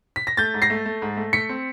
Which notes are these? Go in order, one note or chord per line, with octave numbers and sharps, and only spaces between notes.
B6
A#6
A3 G6 A6
G#2
A#6 C7
A3
A3
G#2
A3
A3 B6 C#7
C4